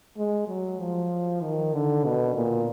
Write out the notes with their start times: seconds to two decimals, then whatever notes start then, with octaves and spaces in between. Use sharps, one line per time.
0.17 G#3
0.48 F#3
0.79 F3
1.42 D#3
1.74 D3
2.05 B2
2.35 A#2